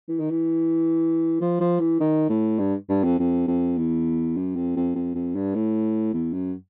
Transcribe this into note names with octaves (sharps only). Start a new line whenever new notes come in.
E3
D#3
E3
F3
F3
E3
D#3
A2
G2
G2
F2
F2
F2
E2
F#2
F2
F2
F2
F2
G2
A2
E2
F#2